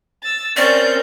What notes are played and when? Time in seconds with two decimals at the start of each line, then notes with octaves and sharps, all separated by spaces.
0.23 E6 A6
0.57 C4 C#4 A#4 D5 G6